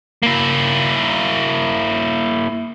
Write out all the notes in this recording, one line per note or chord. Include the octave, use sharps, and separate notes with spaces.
A#3 E4